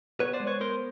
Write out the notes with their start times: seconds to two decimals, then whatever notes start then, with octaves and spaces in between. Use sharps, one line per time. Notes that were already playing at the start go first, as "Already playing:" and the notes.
0.20 B3 B4 C#5
0.33 C5 D5
0.40 G#3
0.47 B4 C#5
0.61 B3 A#4 C5